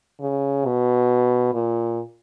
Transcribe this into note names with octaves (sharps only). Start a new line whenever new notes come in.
C#3
B2
A#2